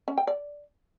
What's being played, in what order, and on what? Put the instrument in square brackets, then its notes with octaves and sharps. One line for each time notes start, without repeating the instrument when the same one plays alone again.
[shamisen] C#4
G5
D5